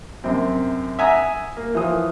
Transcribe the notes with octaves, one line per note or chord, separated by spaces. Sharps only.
F#2 C3 C4
E5 F#5 G#5 A#5 D#6
A#3
E3 F3 D#6